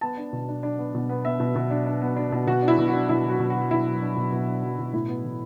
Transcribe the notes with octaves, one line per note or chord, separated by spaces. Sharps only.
B3 A5
D4
B2
D4
D4
B3
B2
B3
B3 E5
B2
B2
D4
D4
B3
D4
B2
B2 F#4
D4
E4
B2
F#4
D4
B2 E4
F#3
F#4
B2
F#4
F#3
B2 E4
F#3
D4
B2
B2
D4
F#3
B2
A2 E4
B3
E3